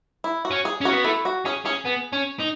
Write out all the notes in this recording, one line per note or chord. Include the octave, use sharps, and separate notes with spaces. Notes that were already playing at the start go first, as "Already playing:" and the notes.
E4
F#4
C#4
G#4
C#4 F#4
B3
A3 E4
F#4
C#4 G#4
C#4 G#4
B3
C#4
D#4